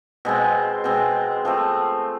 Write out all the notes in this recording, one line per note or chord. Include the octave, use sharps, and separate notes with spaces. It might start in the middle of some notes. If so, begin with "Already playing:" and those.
B2 G#3 C4
B2 G#3 C4
F3 A3 C4